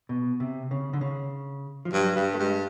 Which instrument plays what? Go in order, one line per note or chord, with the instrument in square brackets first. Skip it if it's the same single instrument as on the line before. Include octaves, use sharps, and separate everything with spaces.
[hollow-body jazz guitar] B2
C3
C#3
D3
C#3
F3
[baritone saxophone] G2 [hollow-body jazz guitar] F#3
[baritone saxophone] G2 [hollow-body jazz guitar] G3
[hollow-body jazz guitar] A3
[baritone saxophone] G2 [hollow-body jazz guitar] G#3